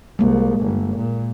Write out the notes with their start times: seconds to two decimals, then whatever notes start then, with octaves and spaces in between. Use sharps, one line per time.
0.19 C2 G#3 A#3
0.61 G1
0.97 A#2